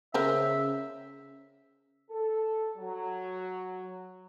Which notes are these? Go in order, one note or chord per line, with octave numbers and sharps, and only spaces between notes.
C#3 A#4 C5 E5 A#5
A4
F#3